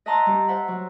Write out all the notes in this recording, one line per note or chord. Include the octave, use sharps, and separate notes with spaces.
D#5 E5 F#5 A5 A#5 C6
G3 G4
C5 E5 F#5
F#3